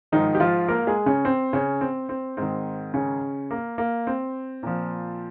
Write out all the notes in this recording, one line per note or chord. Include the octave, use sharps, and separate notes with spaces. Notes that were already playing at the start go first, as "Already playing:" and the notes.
G#2 D#3 F3 D#4
G4
F3 F4
A#3 A#4
G#3 G#4
C#3 C#4
C4
C#3 C#4
C4
C4
G#2 D#3 C4
C#3 C#4
A#3
A#3
C4
A#2 F3